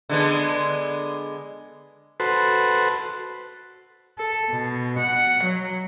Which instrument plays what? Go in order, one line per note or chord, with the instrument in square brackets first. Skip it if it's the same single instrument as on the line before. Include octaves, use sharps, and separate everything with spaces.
[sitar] D3 G#3 B3
[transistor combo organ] F#4 A4 B4 C5
[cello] A4
B2
F#5
F#3